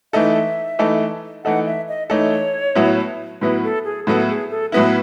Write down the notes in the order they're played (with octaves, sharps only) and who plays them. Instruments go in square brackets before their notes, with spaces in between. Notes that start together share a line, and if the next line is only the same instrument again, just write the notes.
[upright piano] E3 A3 D#4 A4 [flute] E5
[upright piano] E3 A3 D#4 A4
[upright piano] E3 A3 D#4 A4 [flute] F#5
[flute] E5
D#5
[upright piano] E3 A3 D#4 A4 [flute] C#5
[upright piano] A2 F#3 B3 E4
[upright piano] A2 F#3 B3 E4 [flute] B4
[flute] A4
G#4
[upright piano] A2 F#3 B3 E4 [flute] A4
[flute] G#4
A4
[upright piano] A2 F#3 B3 E4 [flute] B4